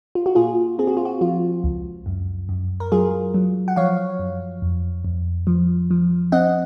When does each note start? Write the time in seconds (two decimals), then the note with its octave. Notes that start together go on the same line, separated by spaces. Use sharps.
0.15 F4
0.26 F#4
0.35 A#2 F4 G#4
0.79 C4 G#4
0.88 F#4
0.97 F4
1.05 F#4
1.21 F3 F4
1.64 C#2
2.06 F#2
2.49 F#2
2.80 A#4
2.92 F#3 F4 G#4
3.34 F#3
3.68 F#5
3.76 F3 C#5 F5
4.19 F#2
4.62 F2
5.05 F2
5.47 F3
5.91 F3
6.32 C4 D#5 F#5